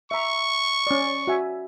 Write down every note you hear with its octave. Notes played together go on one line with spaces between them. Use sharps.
E5 A#5 C#6
C#4 D5
F#4 E5 G#5